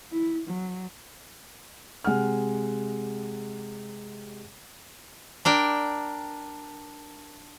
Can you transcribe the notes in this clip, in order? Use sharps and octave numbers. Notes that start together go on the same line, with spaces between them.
E4
F#3
C3 G#3 F#5 F6
D4 A#4 G5